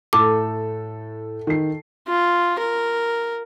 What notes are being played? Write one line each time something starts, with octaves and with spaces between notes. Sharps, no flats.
A2 A3 A4 D6
D#3 C7
F4
A#4